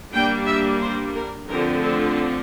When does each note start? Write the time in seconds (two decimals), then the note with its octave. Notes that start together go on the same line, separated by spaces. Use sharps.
0.12 G3 A#3 D4 G5
0.46 E5
0.81 C5
1.14 A#4
1.48 D3 F3 A3 C4 A#4
1.82 A4